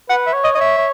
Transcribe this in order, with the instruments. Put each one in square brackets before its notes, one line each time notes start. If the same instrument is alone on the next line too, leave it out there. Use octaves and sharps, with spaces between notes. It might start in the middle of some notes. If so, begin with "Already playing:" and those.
[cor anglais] B4 [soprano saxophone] F#5
[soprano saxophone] E5
[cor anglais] C#5
[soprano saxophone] D#5
[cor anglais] C#5 [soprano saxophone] D#5
[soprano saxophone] E5
[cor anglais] C#5